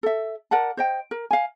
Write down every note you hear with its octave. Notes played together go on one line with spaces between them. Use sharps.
A4 E5
A#4 D5 F#5 A5
C5 D#5 G5
A#4
F5 G#5